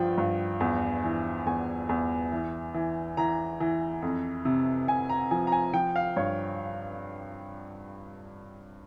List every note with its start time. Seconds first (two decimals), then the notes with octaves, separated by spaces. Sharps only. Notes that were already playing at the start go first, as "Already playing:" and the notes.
Already playing: G2 F3 G5
0.18 G2
0.60 E2
1.04 E3
1.47 E2 G#5
1.89 E2
2.32 E3
2.74 E3
3.17 E3 A#5
3.60 E3
4.02 F2
4.45 C3
4.88 C3 G#5
5.09 A#5
5.31 F3 G#5
5.47 A#5
5.52 G#5
5.73 F3 G5
5.96 F5
6.16 G2 C#5